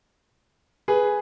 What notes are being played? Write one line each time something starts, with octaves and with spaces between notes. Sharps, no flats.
G#4 B4